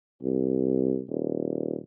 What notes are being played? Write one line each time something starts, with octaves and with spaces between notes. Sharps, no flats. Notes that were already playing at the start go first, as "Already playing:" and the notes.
C2
D#1